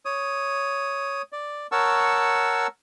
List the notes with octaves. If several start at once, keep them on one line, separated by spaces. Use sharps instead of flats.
C#5 D#6
D5
A#4 C#5 F#5 A5 C#6 E6